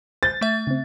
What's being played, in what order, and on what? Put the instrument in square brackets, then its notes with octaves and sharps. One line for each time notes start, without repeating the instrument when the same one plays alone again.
[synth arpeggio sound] C5 G6 [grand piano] A6
[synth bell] A3 E5 [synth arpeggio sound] B6 E7
[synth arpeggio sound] C#3 C4